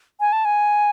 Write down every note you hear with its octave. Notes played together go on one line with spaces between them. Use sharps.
G#5
A5
G#5